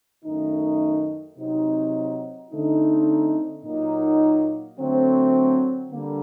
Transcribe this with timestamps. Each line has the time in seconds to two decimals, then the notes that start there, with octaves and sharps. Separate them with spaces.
0.24 F#2 D#3 A3 D#4
1.37 C3 F#3 C4 D#4
2.51 D3 A3 C4 D#4
3.64 A#2 F#3 A#3 D#4
4.78 D3 F#3 A3 C4
5.92 D3 G3 A#3